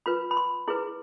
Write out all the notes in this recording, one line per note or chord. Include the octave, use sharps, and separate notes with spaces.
F4 B4 B5
B5
C6
E4 G#4 B4